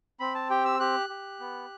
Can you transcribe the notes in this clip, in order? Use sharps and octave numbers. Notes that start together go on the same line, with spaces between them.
C4 B5
A5
G4 G5
E6
G4 F#6
G4
B3